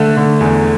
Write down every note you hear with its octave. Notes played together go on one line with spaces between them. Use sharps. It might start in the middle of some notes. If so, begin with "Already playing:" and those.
Already playing: D3 A3
D3
E2